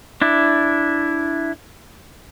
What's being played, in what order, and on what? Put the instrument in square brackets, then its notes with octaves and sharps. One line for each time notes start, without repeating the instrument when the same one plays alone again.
[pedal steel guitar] D4 E4